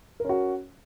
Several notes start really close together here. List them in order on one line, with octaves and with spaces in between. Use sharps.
A#4 C#4 F#4